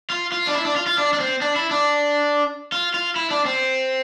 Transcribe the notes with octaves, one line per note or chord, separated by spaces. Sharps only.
F4
F4
D4
E4
D4
F4
F4
D4
D4
C4
D4
E4
D4
F4
F4
E4
D4
C4